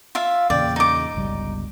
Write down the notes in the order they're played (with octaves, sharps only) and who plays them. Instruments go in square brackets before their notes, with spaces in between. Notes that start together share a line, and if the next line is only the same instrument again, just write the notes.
[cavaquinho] F4 E5 F5
[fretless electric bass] E2 A#2 C#3 [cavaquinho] D5 G5
[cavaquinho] D#4 D6
[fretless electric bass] G1 C#2 G3